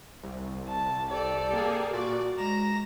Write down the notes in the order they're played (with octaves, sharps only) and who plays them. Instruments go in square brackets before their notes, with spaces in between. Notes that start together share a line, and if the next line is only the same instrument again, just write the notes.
[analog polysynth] C2
[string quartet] A5
G4 A4 D5
[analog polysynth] A#3 G#4
[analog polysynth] A#2 D5 [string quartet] F#4
[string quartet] G#3 A#5 A#6 [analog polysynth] E7